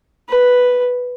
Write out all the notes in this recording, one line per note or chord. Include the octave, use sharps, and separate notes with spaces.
B4